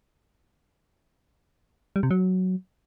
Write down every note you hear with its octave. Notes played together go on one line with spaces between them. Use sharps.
G3
C3
F#3